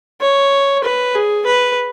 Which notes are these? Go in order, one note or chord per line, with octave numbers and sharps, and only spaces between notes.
C#5
B4
G#4
B4